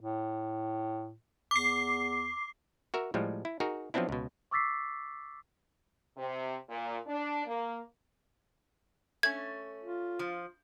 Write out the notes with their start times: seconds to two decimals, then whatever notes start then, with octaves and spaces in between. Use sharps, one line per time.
0.02 A2
1.51 E2 D6 C7
2.94 F#4 A#4 E5
3.14 A2 F3 G3 G#3
3.45 E4
3.60 D#4 F#4 G#4 A#4
3.94 F3 F#3 B3 C4 D4 E4
4.09 C#2 B2
4.51 C#6 D6 E6 A6 B6 C7
6.15 C3
6.69 A#2
7.06 D4
7.44 A#3
9.23 A3 C#4 G#6
9.84 F4
10.19 F3